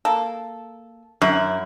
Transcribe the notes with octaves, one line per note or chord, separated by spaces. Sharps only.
A#3 A4
F#2 E4